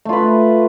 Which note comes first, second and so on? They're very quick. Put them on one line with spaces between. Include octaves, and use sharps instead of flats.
A3 F4 B4